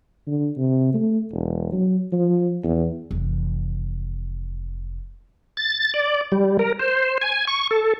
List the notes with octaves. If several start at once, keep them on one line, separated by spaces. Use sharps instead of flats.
D3
C3
A3
E1
F#3
F3
E2
F1 E3
A6
D5
G3
A#4
C5
G#5
C#6
A4